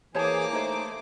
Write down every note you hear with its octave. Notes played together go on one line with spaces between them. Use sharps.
E3 A#3 G#4 C5 C#5 A5 D6
A3 D#4 C5 C#5